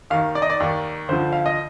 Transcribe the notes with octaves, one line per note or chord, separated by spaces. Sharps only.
D#2 D#3 F5
D5
D#5
D5
D#2 D#3
D2 D3 F3 C5
F5
D#5